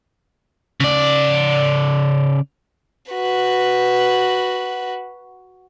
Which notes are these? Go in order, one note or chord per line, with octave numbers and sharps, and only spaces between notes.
C#3 D5
F#4 B4